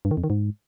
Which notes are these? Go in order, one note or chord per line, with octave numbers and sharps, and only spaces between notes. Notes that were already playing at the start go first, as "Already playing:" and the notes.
G2
D#3
F2
D#3
G#2